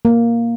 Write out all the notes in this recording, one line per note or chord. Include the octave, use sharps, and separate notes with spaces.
A#3